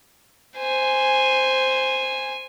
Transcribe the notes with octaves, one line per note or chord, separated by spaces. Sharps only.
C5 G#5